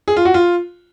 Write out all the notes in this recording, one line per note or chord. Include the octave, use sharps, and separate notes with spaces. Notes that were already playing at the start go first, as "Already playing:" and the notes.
G#4
F4
F#4
F4